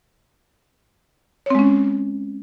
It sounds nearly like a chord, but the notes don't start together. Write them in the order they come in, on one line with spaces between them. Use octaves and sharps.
C#5 C4 G#3 C#4